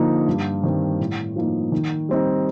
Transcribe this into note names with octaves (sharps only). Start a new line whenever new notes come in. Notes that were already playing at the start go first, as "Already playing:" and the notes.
Already playing: D3 F3 A#3 D#4
G2
D#3 G3 C4
A2
F3 A#3 D#4
D#3
G3 C4 D#4